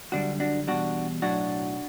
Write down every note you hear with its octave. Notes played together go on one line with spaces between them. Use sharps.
F#2 D3 G3 D4 F#4
D4 F#4
E2 B2 G3 D4 F#4
B1 A2 F#3 D4 F#4